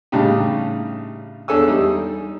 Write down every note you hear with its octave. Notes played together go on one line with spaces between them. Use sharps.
A2 C#3 G3 D4 D#4 G4
E2 D4 A4 C#5 G#5 E6
G3 D#4